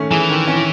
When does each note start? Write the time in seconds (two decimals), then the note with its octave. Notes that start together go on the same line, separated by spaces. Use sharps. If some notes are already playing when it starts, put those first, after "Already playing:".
Already playing: D#3 A3 C#4
0.11 E3 G#4
0.30 D#3
0.47 C#4